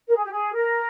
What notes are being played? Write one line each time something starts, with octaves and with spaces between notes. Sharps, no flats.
A#4
G#4
G4
G#4
A#4